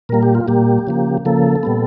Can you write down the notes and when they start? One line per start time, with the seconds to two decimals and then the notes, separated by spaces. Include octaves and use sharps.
0.09 A#2 G3 A#3 A#4
0.23 G4
0.35 F4
0.48 A#2 G3 A#3 G4
0.87 C#3 F3 A#3
1.25 C#3 F3 A#3 A4
1.63 A#2 G3 B3